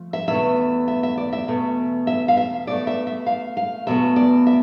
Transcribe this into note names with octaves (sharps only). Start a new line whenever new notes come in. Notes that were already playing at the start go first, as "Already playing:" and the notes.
Already playing: F3 A3
E5
E2 B2 A3 E5
E5
E5
D5
E5
E2 B2 A3
E5
F5
E5
B2 A3 D5
E5
E5
F5
F5
E2 B2 A3 E5
D5
E5